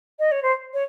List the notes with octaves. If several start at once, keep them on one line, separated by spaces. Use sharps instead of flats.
D#5
C#5
C5
C#5